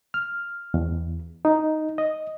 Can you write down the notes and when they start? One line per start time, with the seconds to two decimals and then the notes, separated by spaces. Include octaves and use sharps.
0.14 F6
0.74 E2
1.45 D#4
1.98 D#5